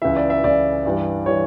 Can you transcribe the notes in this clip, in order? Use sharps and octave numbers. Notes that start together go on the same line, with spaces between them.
C#2 C#3 E3 E5
D5
E5
C#2 C#3 E3 D5
G2 E3 G3
E3 G3 C#5